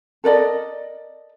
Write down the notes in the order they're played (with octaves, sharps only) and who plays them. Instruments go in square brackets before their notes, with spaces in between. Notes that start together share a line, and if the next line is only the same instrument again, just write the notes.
[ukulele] A4 A#4 D5 D#5